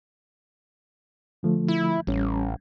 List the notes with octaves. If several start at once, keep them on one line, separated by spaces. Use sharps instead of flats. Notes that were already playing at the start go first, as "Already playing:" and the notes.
D3 F3 A3
E4
A1 G3 C#4